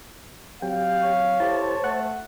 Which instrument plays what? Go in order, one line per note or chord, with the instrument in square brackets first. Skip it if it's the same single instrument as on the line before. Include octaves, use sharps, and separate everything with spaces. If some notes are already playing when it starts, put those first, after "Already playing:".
[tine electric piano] F#3 C4 [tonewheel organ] G4 G5 [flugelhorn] F5
[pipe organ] C#5
[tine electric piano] E4 G4 A4 [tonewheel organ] C5 A5
[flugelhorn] A3 [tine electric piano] F#5 F#6